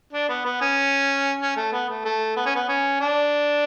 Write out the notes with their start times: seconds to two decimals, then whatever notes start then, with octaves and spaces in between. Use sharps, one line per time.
0.13 D4
0.29 B3
0.45 B3
0.61 C#4
1.41 C#4
1.56 A3
1.73 B3
1.89 A3
2.05 A3
2.36 B3
2.46 C#4
2.55 B3
2.69 C#4
3.01 D4